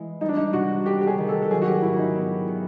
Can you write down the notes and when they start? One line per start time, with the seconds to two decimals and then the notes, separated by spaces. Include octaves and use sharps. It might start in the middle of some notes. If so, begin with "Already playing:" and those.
Already playing: E3 G#3
0.21 G3 D#4
0.29 D4
0.37 D#4
0.53 C3 F#4
0.86 C3 G4
1.01 G4
1.07 G#4
1.18 D#3
1.29 A4
1.42 A4
1.50 F#3 G#4
1.62 F#4
1.66 G4
1.82 G#2 E4
1.92 E4
1.99 D#4
2.15 B3
2.47 D#3